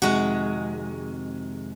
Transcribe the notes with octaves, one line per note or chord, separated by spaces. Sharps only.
F2 C3 D#3 G#3 F#4